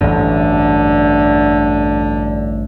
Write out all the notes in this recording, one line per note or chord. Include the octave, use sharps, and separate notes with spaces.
A1 D2 G2 D3